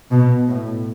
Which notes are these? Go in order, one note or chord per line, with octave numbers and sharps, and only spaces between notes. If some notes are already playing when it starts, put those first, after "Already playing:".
B2
A2